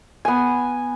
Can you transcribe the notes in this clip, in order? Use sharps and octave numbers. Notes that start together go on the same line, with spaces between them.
B3 G#5